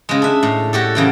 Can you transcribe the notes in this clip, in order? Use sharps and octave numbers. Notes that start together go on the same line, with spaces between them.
C#3 G#3
D4 E5
A2
F#4 G4 A4
C#3 E3 G5